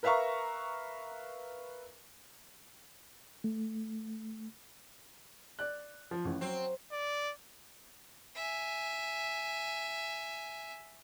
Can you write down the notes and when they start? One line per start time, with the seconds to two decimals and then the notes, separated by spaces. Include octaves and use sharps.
0.03 A#4 B4 E5 F5 A#5 C#6
3.44 A3
5.59 D5 F#6
6.11 F3
6.25 A1 A2
6.41 F#3 C4
6.92 D5
8.36 E5 G#5